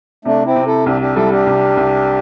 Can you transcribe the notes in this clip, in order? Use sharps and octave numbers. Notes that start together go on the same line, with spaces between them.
C3 A3 D4
C4 E4
C3
E4 A4
C2 D4 G4
D4 G4
G3 E4 A4
D4 G4
C2
C2